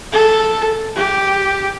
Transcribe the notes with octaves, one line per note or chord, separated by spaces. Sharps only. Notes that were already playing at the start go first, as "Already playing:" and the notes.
A4
G4